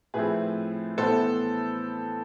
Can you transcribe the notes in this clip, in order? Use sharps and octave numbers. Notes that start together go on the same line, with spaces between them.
A2 F3 A3 C4 G#4 B4
A2 E3 B3 A4 C5